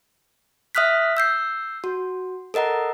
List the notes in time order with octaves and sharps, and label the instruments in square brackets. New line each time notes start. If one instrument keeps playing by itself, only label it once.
[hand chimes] E5 D#6 F6 F#6 B6
E6 G6 C7
F#4
A4 A#4 D#5 F#5 A#5